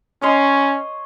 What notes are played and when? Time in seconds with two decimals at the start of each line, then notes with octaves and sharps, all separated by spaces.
0.22 C#4 C#5 D#5 C6